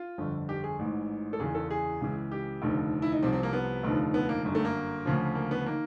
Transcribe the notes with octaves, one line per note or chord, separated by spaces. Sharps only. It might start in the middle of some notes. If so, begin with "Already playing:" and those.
Already playing: F4
G1 F2 D3
G4
G#4
A1 G#2 E3
A4
F#1 E2 C#3 E3 G#4
A4
G#4
C#2 C#3 E3
G4
F1 D#2 D3 F3
E4
D#4
C2 C3 F3 C4
C4
A#3
B3
F1 D#2 D3 F3
B3
A#3
G1 F#2 D3
A3
A#3
D2 C#3 F3
A#3
B3
D#3 A#3